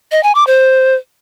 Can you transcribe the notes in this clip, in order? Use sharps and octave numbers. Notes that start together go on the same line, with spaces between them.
D#5
G#5
D6
C5